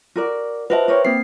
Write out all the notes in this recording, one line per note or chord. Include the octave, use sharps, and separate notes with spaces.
F#4 A#4 D5
F#4 B4 C5 D#5 E5 A5
G4 A#4 C#5
A#3 C4 G4 C7